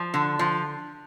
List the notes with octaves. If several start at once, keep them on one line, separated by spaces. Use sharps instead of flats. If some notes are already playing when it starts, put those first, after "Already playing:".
Already playing: F3
D3
F3